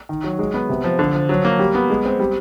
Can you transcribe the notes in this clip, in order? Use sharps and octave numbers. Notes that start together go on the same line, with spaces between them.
D#3
F#3
G#3
B3
C3
F3
D3
F3
F#3
A#3
G3
B3
G#3
C4
G3